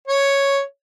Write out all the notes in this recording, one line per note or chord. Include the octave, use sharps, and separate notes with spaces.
C#5